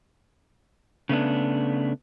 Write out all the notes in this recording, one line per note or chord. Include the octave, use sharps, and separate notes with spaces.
C#3 A3 B3 D4